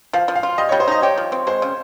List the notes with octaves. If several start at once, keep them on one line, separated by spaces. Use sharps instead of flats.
F3 F5
F3
F5
F4
G3 D#5
C#5
G3
C5
D#4 D#5
G4 C#5
F3
C4
G#3 C5
C#3